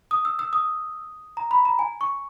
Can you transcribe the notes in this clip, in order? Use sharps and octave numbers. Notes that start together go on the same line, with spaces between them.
D#6
E6
E6
D#6
A#5
B5
A#5
G#5
C#6